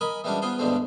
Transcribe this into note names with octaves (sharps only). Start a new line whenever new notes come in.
A#4 D#5 G#5 B5
E3 G3 G#3 C#4 D4 F#4
B3 F4 G#4 C5
D2 G2 B2 D3 G#3 C4